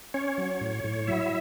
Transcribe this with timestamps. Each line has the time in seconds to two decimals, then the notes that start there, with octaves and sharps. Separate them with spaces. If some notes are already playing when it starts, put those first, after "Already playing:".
0.14 C#4 C#5
0.38 F#3
0.61 A2
0.84 A2
1.07 F#3 E4 E5